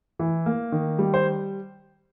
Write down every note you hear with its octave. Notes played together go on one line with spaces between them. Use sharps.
E3
A#3
D#3
G3
C5